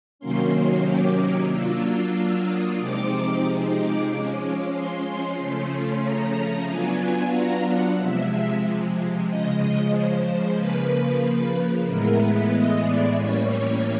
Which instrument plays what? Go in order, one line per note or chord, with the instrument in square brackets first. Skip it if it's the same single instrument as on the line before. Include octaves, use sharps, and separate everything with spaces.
[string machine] C3 D#3 F#3 A#3 C#4 C6
D6
F#3 A#3 D4 F4 E6
E6
D#6
C3 F3 G#3 C4 D#4 D6
D6
F3 G#3 C#4
C6
C#3 F3 A3 C#4 C6
A#5
F#3 B3 D4 F4 G#5
G#5
A#5
F#5
C3 F3 G#3 E5
C#3 F3 G#3 D#5
C5
C#3 F3 A#3 B4
B4
A2 E3 G#3 B3 E4 A#4
B4
D#5
D5
A2 E3 G3 A#3 C#4 C#5